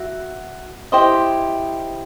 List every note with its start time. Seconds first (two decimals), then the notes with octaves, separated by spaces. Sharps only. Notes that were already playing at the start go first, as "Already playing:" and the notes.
Already playing: F#4 E5
0.92 E4 G4 C5 D#5